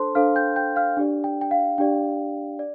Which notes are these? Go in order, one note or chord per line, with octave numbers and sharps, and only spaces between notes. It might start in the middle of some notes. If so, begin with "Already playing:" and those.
Already playing: D4 A4 C5 A5 C6
D4 A4 C5 F5 F6
G5 G6
G5 G6
F5 F6
D4 G4 D5
G5
G5
F5
D4 G4 D5 G5
D5